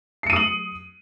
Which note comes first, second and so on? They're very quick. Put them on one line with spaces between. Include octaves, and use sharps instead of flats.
C7 C#7 D#7 D#6 F#7